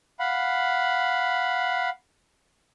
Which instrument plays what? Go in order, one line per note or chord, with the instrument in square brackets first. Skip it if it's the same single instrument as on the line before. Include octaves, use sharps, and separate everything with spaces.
[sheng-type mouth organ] F5 F#5 B5